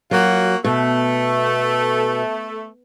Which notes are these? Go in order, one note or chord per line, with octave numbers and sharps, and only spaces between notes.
F#3 A#3 F4 F#4
B2 A3